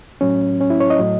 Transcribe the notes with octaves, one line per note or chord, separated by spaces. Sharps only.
A2 F#3 C#4
C#4
E4
C#5
D#5
A2 F#3